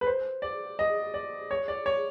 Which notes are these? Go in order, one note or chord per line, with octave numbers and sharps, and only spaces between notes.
B4
C5
D5
D#5
D5
C#5
D5
C#5